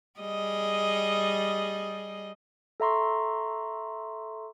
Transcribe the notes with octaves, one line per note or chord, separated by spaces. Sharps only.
G3 G#4 D#5
A4 E5 A#5 C6 C#6